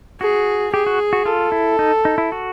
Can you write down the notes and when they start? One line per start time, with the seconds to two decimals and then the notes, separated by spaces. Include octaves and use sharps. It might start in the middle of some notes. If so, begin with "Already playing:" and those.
0.20 F#4 G#4
0.73 G4 G#4
0.86 F#4
1.13 F#4
1.25 F4 A4
1.52 E4
1.79 D#4
2.05 D#4
2.18 E4
2.32 F#4